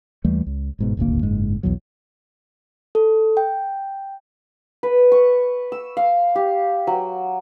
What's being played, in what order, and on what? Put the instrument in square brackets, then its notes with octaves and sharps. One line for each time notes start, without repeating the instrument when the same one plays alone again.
[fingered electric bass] D#2 E3 G3 A3
C#2
G1 G#2 B2
D#1 G#1 D2 A#3
F#1 G#2 G#3
B1 E2 B2 F#3
[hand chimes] A4
G5
[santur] B4
C#6
E6
F5
G4
F#3